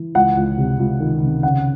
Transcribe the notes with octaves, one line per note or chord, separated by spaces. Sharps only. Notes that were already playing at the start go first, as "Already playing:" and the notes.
Already playing: E3
C#2 F#5
C#2
C3
C#2
D#3
C3
C#3 F#5